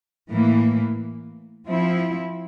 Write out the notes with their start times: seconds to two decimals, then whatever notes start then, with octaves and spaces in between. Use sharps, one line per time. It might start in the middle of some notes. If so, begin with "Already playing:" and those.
0.30 A2 E3 A#3
1.67 F3 C4 E4